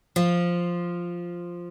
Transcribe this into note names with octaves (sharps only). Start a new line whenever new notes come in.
F3 F4